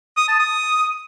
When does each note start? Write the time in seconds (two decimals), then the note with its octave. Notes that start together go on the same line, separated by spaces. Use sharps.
0.17 D#6
0.28 A5
0.39 D#6